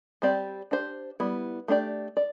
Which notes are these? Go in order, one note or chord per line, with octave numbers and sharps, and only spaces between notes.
G3 C4 G4 D5
D4 G4 C5
G3 B3 E4
A3 D4 G4 D5
D5